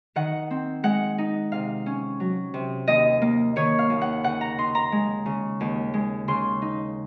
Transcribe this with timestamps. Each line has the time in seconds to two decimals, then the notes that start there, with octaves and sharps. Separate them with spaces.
0.16 D#3 F#5
0.51 C4
0.83 G#3 F#5
1.18 D#4
1.52 C3 F5
1.86 C#4
2.20 F#3
2.54 C3
2.88 D#2 D#5
3.22 A#3
3.56 D#3 C#5
3.79 F5
3.90 D#2
4.02 F#5
4.24 C#3 F#5
4.41 A#5
4.58 D#4 C6
4.75 A#5
4.92 G#3
5.26 C#3
5.61 D#2
5.94 G#3
6.28 C#3 C6
6.62 D#4